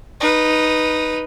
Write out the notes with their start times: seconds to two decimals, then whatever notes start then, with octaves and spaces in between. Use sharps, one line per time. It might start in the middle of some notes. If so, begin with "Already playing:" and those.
0.20 D#4 B4